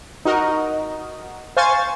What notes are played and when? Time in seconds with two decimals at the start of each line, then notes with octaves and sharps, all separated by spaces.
0.25 D#4 F#4 A#4 D#5
1.57 C5 F5 G#5 C#6 G#6 A6